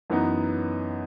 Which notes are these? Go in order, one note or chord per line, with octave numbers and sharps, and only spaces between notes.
F#2 E3 B3 D#4